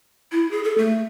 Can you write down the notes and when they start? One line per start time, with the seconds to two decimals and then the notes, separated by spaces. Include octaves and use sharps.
0.32 E4
0.51 G#4
0.64 A4
0.78 A3